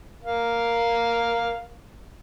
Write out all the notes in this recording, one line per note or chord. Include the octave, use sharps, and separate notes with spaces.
A#4 F5